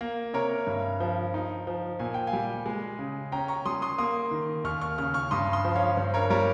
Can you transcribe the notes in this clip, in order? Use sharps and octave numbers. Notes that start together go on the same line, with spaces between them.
A#3
C3 A#4 C#5
G2
F3
D#4
F3
A#2 G#5
G5
F5 G#5
G3
G#3
C#3
C#4 G5 A#5
A#5 C#6
G3 C6 D#6
C6 D#6
A#3 C6 D#6
D#3
D#2 C#6 F6
C#6 F6
C#3 C#6 F6
C#6 F6
G2 C6 D#6
C6 D#6
F3
C#5 F5
G2 C5
A#4 C#5
G3 A#4 C#5